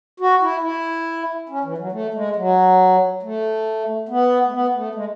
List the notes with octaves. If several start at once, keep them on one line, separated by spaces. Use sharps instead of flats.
F#4
E4
E4
C#4
E3
F#3
A3
G#3
F#3
A3
B3
A3
B3
A3
G#3